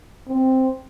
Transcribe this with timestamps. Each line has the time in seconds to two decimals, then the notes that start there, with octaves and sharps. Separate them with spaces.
0.28 C4